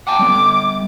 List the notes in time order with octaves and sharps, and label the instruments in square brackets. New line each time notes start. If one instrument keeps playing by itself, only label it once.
[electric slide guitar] F#5 G5 A5 [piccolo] D6
[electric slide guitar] G3 B3